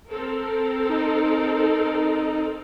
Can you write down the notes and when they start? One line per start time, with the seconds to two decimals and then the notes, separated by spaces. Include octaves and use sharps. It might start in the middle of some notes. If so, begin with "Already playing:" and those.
0.10 C4 A4 A#4
0.89 D#4